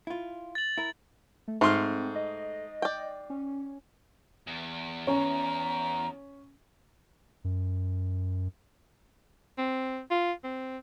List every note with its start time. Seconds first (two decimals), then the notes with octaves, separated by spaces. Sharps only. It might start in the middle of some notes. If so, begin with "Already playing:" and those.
0.07 E4 F4
0.55 A6 F#7
0.78 E4 A#4
1.48 A3
1.61 G#2 A3 C4 C6 F6
2.15 D#5
2.82 D5 G5
3.30 C#4
4.47 E2
5.07 C#4 A#5
7.44 F#2
9.58 C4
10.11 F4
10.44 C4